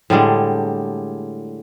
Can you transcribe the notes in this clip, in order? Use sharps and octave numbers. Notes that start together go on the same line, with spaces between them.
A2 D3 G3 G#3